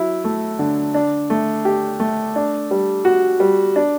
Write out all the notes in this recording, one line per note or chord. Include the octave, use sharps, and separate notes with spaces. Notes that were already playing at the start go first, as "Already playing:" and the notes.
Already playing: F#3 E4
A3
D3
D4
A3
G4
A3
D4
G3
F#4
G3
D4